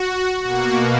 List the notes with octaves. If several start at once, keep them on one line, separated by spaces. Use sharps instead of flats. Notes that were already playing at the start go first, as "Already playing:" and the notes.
Already playing: F#4
B2 A#3 F#4